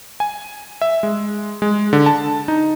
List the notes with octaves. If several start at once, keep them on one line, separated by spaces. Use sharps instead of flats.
G#5
E5
G#3
G#3
D3
A5
D#4